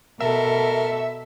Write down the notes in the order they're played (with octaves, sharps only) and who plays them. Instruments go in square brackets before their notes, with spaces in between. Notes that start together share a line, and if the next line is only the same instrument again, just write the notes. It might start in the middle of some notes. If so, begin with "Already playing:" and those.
[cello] B2 A4 [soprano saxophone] A#4 [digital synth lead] E5